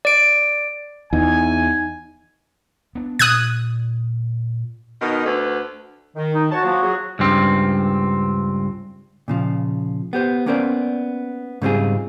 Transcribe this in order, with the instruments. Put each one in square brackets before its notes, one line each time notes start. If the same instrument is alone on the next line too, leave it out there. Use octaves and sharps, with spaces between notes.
[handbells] D5 D7
[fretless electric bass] E2 [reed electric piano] D#4 [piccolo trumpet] G#5
[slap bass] B3 D4
[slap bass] A#2 [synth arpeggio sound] D#6 F#6 G#6
[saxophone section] B2 D#3 D#4
D2 D3 B4
[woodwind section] D#3
[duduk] D#4
[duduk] F#4 [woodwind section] C#5 A5
[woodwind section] F3 F#3 A#3
F#3 G#4
[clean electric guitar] C#2 G2 C4
[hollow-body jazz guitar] A#2 C#3 F3
B3 G4 C5
A#3 B3 C#4 A#4 C5 D5
G#2 C#3 G3 C4 F4 G#4